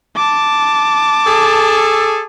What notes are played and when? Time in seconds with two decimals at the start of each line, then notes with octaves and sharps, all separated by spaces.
0.16 A5 D6
1.27 G#4 A4